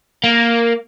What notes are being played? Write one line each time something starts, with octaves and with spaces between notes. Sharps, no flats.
A#3